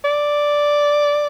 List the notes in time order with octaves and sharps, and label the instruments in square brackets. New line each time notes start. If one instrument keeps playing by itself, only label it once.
[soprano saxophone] D5